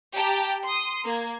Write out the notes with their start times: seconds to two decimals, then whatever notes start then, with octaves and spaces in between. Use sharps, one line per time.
0.14 G4 G5 A5 A#5
0.64 C6 D#6
1.05 A#3 G#6